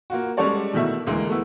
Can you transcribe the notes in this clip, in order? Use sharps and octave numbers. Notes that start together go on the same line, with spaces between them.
A#3 F4 F#4
G3 G#3 C#4 A4 C#5 D5
B2 D#3 A3 E4 E5 E6
D2 E3 G#3 A#3
A3 B3 E4